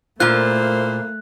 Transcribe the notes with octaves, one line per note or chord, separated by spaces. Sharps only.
A#2 A3 A#3 E4 F4 C5 F#6